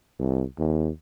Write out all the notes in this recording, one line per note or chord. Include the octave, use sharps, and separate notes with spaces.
C2
D#2